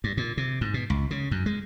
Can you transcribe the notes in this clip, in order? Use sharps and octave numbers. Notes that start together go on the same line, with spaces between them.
G2
A#2
C3
G#2
B2
C#2
C#3
F#2
G#3